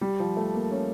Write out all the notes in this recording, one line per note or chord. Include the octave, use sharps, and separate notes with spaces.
G3
F3
A3
A#3
C#4